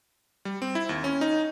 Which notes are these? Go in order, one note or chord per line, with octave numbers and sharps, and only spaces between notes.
G3
C4
E4
D#2
C#4
D#4